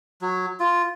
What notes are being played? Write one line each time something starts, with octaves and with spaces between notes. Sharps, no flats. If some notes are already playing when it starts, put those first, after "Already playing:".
F#3
F4